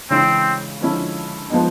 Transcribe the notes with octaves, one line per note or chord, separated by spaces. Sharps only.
C#3 E3 G#3 C4
D3 F3 G#3 C#4 E4
F3 G#3 B3 D#4